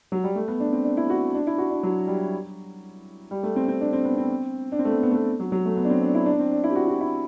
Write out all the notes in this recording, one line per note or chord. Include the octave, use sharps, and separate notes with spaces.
F#3
G3
A3
B3
D4
C4
D4
E4
F#4
D4
E4
F#4
D4
F#3
G3
G3
A3
C4
C4
D4
C4
B3
C4
D4
C4
A3
B3
B3
A3
B3
F#3
F#3
A3
B3
D4
C4
D4
E4
D4
C4
D4
E4
G4
F#4
F#4
E4